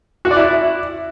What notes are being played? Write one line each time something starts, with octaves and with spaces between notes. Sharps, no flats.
F#4
D5
E4